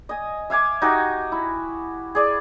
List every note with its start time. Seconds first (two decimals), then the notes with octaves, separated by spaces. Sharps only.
0.09 D#5 G#5
0.50 E5 F5 G#5 D6
0.82 D#4 F#4 G4 G#5
1.32 E4
2.15 G#4 D5